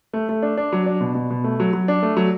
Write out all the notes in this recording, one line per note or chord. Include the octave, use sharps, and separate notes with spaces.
A3
A3
D4
D4
F#3
D4
B2
B2
B2
A3
F#3
F#3
D4
A3
F#3